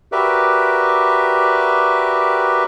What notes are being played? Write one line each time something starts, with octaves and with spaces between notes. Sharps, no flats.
F#4 G4 A#4 B4 D5 E5